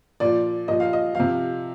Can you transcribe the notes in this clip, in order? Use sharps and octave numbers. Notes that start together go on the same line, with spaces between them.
A#2 F3 D5
A#2 F3 D#5
F5
D#5
C3 F3 F5